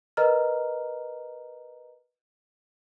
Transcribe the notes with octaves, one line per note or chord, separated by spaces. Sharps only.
A#4 B4 D#5 A#5 F6